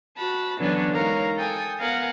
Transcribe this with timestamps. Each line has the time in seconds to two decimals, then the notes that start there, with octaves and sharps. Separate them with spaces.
0.19 F#4 A5 B5
0.60 D3 E3 F#3 B3 C#4 D4
0.95 G#3 D#4 F#4 A#4 C#5 F5
1.38 A4 G5 G#5 D#6
1.79 B3 A#4 F5 F#5 G#5